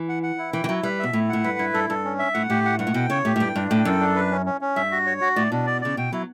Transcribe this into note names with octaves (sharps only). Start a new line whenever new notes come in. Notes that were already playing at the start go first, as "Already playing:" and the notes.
Already playing: E3
F#5
F#5
E4
E3 G5
E3
F#3 E4
G3 B4
B2 E5
A2 E4
A2 F#5
G2 B4
G2 E4
G2 A4
G2 A4
C#4
E5
A2 F#5
A2 G4
F#5
G2 F#5
A2
B2 G5
C#3 C#5
A2 G4
A2
G2 G5
G2 D4
A2 G5
F#2 A4
D4
B4
C#4
C#4
C#4
G2 E5
F#4
C#5
F#4
A2 D5
B2 D4
D5
C#3 D5
B2 G5
F#3 E4